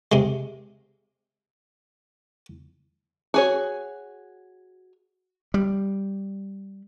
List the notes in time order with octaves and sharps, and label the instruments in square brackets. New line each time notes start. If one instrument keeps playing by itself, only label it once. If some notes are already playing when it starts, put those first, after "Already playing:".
[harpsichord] C3 G#3
[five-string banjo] F#4 G#4 C#5
[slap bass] G3